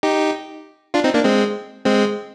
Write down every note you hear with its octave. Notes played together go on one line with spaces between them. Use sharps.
D#4 G4
D4 F4
C4 D#4
A#3 D4
G#3 C4
G#3 C4